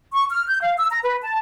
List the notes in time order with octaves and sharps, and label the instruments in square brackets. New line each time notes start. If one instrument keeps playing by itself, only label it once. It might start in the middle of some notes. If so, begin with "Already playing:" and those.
[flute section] C#6
F6
G6
F5
E6
A#5
B4
A5